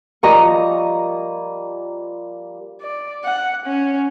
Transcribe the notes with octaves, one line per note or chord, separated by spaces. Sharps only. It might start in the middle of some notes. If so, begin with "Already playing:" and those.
F3 G3 A#3 D#5 A#5 C#6
D5
F#5
C#4